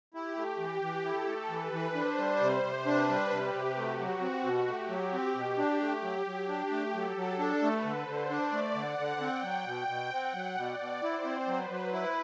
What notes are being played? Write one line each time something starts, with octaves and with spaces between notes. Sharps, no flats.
E4 G4
A3
E3 G4
E3
E4 A4
A3
E3 B4
E3
D4 C5
G3
C5
C3
C5
C3
D4 B4
G3
C3 G4
C3
A3 F#4
F#3
C4
B2
A3 G4
F#3
C4
B2
D4
A3
F#3
F#3
D4 G4
A3
F#3 A4
F#3
D4 A4
A3
B4
D3
C5
D3
D4 D5
A3
D3 F#5
D3
C4 G5
F#3
B2 G5
B2
C4 F#5
F#3
B2 D5
B2
E4 C5
C4
F#3 B4
F#3
E4 B4